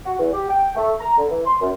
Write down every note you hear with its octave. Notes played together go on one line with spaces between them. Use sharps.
F#4
E2
G4
G5
A3
A#5
D3
E3
C6
F#2